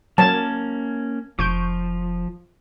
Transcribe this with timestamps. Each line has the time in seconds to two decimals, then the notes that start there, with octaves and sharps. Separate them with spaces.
0.18 F#3 A#3 C#4 A#4 A5 G#6
1.39 F1 F3 C#6 G6 D7